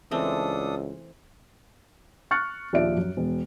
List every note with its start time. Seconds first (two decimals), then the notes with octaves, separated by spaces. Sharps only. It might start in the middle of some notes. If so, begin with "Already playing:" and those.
0.11 C#2 E3 A3 C4 D4 A4 D#6
2.31 C#6 F6 F#6 A6 C#7
2.73 A#1 D#2 F3 D5 E5 D7
2.96 F#2
3.17 E1